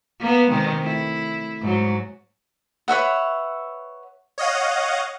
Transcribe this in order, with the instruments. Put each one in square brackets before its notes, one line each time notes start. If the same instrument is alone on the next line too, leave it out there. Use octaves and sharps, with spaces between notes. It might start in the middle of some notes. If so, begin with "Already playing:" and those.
[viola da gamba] A#3 B3
C3 D#3 G#3
A3 E4
G#2 F#3
[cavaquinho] B4 C#5 E5 F#5
[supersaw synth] C#5 D#5 F5 F#5